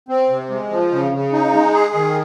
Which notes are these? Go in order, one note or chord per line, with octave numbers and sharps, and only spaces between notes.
C4
C3
G#3
F3
C#3
C#3
D#4
G#3
G#4
D#3